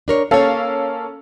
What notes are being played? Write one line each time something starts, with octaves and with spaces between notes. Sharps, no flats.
D4 A#4 C#5
A#3 C#4 A4 C#5 F5